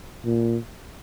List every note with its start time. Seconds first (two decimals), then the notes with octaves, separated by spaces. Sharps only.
0.25 A#2